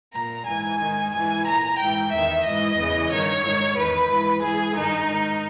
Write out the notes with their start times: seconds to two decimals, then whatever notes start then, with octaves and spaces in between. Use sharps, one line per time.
0.13 A#2 A#5
0.46 G#2 E3 G#5
0.79 G#2 D#3
1.12 G#2 E3 G#5
1.45 A#2 A#5
1.78 G#2 E3 G5
2.11 E2 D#3 E5
2.44 G#2 E3 D#5
2.77 E2 C#3 E3
3.10 G2 D#3 C#5
3.43 G#2 D#3
3.76 E2 D#3 B4
4.09 G#2 E3
4.42 G#2 E3 G#4
4.74 G2 D#3 D#4
5.07 G#2 D#3